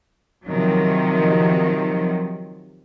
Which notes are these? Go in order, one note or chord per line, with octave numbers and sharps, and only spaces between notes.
C3 D#3 F3 F#3